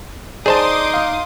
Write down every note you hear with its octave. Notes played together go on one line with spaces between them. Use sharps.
D#4 G#4 C5 D5 A5 C6 D6 D#6
F5